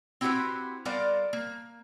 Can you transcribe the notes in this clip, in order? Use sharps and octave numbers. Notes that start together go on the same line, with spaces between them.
C4 E4 F#4 G4 B4 C5
G3 B3 A#4 C5 D5 F5
A#3